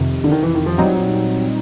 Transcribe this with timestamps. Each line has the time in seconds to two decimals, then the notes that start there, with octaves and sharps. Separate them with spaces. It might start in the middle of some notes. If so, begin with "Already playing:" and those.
Already playing: F2 C3 D#3
0.24 D3
0.32 D#3
0.43 E3
0.55 D#3
0.66 F3
0.78 A#2 F#3 G3 C4 D#4